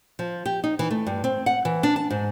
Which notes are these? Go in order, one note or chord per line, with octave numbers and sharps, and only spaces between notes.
F3
G4
D#4
E3
A3
G2
C4
F#5
E3
D4
A5
G#2